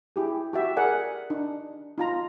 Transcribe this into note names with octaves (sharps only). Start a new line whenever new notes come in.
E4 G4 G#4
F#4 G4 E5
G#4 A#4 D5 F#5 G#5
D4 D#4
D#4 F4 A#5